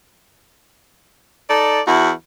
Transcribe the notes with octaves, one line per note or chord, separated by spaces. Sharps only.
D#4 A4 D5
E2 E4 F#4